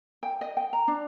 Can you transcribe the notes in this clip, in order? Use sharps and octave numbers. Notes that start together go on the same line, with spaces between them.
G5
D#5
G5
A#5
D4